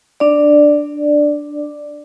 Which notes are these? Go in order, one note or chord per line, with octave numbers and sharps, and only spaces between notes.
D4 D5